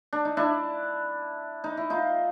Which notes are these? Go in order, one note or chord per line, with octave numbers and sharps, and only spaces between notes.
D4
D#4
D4 E4
D#4
E4
D#4 F4